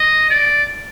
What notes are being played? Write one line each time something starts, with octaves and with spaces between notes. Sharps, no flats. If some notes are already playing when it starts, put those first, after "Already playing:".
Already playing: D#5
D5